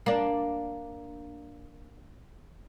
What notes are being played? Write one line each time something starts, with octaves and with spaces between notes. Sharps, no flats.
A#3 D4